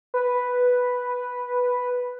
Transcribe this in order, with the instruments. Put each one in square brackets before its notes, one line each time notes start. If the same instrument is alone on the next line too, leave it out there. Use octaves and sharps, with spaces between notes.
[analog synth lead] B4